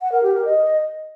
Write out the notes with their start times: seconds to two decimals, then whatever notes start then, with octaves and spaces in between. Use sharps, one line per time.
0.01 F#5
0.12 A#4
0.23 G4
0.34 A#4
0.45 D#5